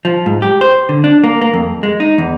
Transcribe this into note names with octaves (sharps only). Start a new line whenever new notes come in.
F3
G#2
G4
C5
D3
D4
A#3
A#3
F2
G#3
D#4
E2